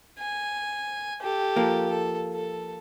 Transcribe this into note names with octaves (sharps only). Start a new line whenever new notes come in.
G#5
G4 A4
F3 A#3
A4
A4